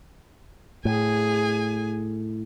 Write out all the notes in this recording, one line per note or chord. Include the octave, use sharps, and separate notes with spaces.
A2 G#4 G#5